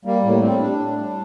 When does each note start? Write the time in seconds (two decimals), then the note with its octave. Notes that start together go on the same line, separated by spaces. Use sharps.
0.05 G3 A#3
0.23 A2 A#3
0.42 G3 C4
0.60 A2 D4
0.79 A2
0.98 G3